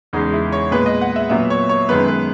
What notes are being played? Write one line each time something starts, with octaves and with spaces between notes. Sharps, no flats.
E2 C#3 G#3 D#4
E4
C#5
A#2 G#3 B3 B4
D#5
F#5
E5
A#2 F#3 B3 E5
C#5
C#5
F#2 D#3 G#3 B3 B4
B4